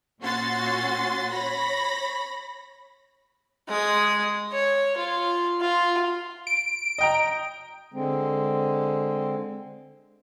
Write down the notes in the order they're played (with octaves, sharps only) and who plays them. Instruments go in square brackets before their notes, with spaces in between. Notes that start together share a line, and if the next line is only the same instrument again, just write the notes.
[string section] A#2 C#4 F#4 C6 A6
C#5 B5 A#6
[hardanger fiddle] G#3 D#6
C#5
F4
F4
[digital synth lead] D7
[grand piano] D#5 G5 A#5
[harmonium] D3 G#3 C4